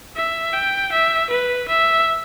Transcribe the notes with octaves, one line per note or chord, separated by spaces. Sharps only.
E5
G5
E5
B4
E5